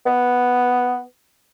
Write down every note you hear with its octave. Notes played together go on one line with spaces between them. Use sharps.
B3